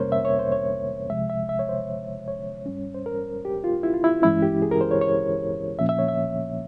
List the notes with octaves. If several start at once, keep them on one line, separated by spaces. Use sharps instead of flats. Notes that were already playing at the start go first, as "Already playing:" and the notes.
Already playing: F2 C3 G3 A#3 C#4 A#4 C5 C#5
E5
C#5
C5
C#5
C2 C3 F3 G#3 E5
E5
E5
C#5
C5
C#5
G#2 G3 C#4
C5
A#4
G4
F4
E4
F4
E4
G2 E3 G#3 C#4 E4
G4
G#4
A#4
C5
C#5
C#5
A#2 F3 A#3 C#4 E5
E5
C#5
E5